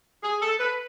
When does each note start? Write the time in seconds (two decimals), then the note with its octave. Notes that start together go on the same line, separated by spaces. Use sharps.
0.23 G#4
0.41 A4
0.60 B4